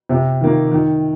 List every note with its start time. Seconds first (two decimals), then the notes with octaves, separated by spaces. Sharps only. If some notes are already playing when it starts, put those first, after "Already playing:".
0.09 C3
0.41 D#3 A#3
0.72 D#3